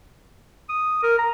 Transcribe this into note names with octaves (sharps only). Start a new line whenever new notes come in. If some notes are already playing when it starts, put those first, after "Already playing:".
D#6
A#4
A#5